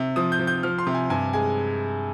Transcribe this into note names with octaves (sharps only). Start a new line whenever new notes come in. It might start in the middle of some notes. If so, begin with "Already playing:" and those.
Already playing: C3
F3 D#6
G6
F3
G6
F3 F6
C6
C3
G#5
G2 G#5
G#3 G#5